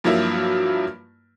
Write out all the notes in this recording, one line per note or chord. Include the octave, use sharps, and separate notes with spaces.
G2 F3 F#3 A#3 E4